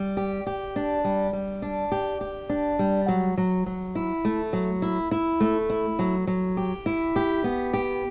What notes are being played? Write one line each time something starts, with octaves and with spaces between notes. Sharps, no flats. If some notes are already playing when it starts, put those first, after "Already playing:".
Already playing: G3
G4
G4
D4
G3
G3
D4
G4
G4
D4
G3
F#3
F#3
F#3
E4
A3
F#3
E4
E4
A3
E4
F#3
F#3
G4
E4
G4
B3
G4